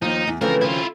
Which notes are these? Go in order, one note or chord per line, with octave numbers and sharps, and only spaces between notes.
D#2 F3 D#4
E2
C#3 E3 F3 A3 B3 C4 A#4
D#3 E4 F4